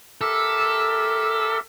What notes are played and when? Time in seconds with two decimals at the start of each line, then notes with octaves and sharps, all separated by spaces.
0.21 G4 A4 A#4 E5